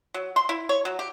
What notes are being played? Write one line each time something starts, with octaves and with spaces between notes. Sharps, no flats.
F#3
C6
E4
C#5
F#3
G4